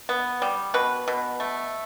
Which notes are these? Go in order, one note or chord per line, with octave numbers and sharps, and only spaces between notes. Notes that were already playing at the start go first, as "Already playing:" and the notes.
B3
G3
B2 B4
B2
A3